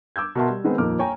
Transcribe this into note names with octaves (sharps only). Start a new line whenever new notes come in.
D6 E6 G6 G#6
B2 F#4 A#4 E5 A5 C6
G3
D#3 G#3 B3 C4
D#1 F2 A#3 D#4 D6 F6
C#5 G5 G#5 A#5